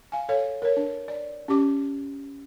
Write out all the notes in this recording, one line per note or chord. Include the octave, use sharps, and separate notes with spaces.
F5 G#5
A4 C#5 F5
A#4 C#5
D4
D5
C#4 G4 D6